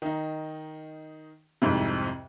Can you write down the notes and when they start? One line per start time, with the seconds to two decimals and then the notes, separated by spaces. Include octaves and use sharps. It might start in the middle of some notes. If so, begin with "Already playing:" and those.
0.02 D#3 D#4
1.62 C2 F2 G#2 C3